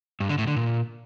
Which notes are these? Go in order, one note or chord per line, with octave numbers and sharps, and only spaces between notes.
G2
D3
A2
D3
A#2